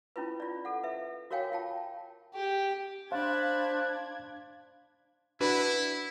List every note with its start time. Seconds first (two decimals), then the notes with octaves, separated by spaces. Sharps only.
0.16 C#4 E4 F4 B4
0.40 F4 D5
0.65 A4 F#5
0.83 B4 E5
1.31 F#4 A#4 C#5 F5 G5 G#5
1.52 F4 G5 A5
2.34 G4
3.12 D4 C5 F5 A5 B5 F#6 G#6
5.40 D4 E4 F#4 B4